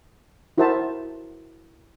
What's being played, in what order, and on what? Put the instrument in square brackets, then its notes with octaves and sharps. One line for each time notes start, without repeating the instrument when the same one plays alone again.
[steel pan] E4 F#4 A#4 C5 E5 A5